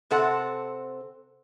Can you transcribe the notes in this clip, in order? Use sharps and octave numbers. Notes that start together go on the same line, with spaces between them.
C3 C4 A4 F#5 A5